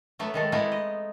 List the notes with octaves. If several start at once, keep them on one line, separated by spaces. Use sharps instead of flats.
F#3 A3 B3 E5
D#3 G#3 A4
G#3 A3 B3 C4 D#4 E4
D#5